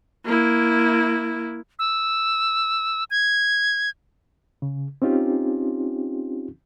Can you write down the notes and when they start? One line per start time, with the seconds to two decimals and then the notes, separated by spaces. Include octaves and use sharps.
0.25 A#3 E4
1.79 E6
3.10 G#6
4.62 C#3
5.02 C4 C#4 D#4 F4 G4